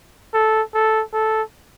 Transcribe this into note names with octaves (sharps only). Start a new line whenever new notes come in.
A4
A4
A4